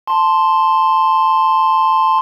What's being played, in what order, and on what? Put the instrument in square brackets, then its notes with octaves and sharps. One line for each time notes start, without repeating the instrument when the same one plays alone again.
[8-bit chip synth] A5 C6